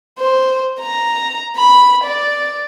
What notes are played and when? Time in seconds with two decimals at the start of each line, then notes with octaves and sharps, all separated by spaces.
0.19 C5
0.80 A#5
1.56 B5
2.04 D5